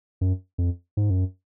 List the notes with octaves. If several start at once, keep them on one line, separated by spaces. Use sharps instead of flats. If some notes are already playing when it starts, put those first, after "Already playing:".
F#2
F2
G#2
F#2